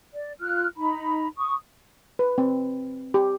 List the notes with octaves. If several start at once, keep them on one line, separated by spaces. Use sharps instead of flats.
D5
F4 F6 F#6
D#4 A#5 B5
C#6 D#6
B4
C4
G4